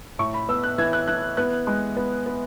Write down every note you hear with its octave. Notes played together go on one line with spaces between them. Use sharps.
A2 C#6
B5
B3 E6
F#6
E3 G#6
F#6
E3 F#6
B3 F#6
G#3
B3
B3